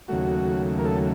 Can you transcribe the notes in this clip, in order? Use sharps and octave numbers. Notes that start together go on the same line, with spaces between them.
D#2 C#3 F#3 A3 F#4
A#4
A4